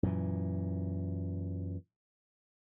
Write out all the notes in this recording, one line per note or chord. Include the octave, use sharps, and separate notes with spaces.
F#2 A#2 E3